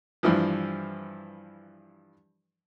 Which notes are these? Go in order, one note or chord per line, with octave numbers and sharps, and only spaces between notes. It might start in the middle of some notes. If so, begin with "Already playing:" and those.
G2 E3 F3